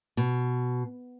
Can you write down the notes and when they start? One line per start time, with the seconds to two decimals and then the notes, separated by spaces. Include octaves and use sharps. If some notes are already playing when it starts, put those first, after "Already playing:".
0.17 B2